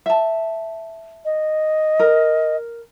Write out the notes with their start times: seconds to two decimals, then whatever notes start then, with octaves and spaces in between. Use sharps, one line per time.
0.06 E5 A5
1.25 D#5
1.99 A#4